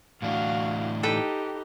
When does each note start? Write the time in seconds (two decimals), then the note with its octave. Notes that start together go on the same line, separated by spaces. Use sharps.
0.22 A2 E3 D4 F#4 F5
1.03 D#4 G4 A4 B4 G5